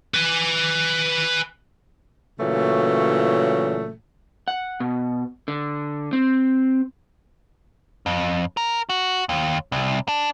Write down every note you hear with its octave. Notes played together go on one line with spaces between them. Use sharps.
B4 G#5
A#2 C#3 E3 F#3 A3
F#5
B2
D3
C4
F2
A#4
F#4
D#2
C2
D4